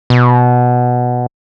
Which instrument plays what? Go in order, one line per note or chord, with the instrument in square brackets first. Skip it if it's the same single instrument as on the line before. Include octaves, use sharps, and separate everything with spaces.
[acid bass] B2